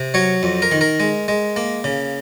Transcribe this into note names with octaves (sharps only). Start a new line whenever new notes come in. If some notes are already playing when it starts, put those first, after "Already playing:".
Already playing: C3
F#3 C#5
F2
A#4
D#3
A#4
G#3
G#3
A#3
C#3